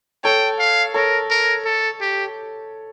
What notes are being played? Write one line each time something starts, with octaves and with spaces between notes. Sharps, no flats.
A4 C#5 G5
F5
A4 A#4 C#5
A#4
A4
G4